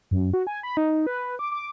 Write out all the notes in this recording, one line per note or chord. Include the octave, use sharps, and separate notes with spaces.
F#2
F#4
G#5
B5
D#4
B4
D6
D6